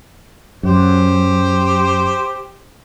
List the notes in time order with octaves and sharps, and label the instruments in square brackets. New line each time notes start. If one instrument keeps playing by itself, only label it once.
[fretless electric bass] F#2 [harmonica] G4 C5